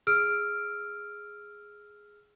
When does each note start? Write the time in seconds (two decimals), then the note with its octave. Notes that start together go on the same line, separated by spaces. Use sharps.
0.07 G#4 E6 F6 D7